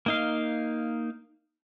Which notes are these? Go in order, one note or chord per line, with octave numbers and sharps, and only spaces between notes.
A#3 D#4 F5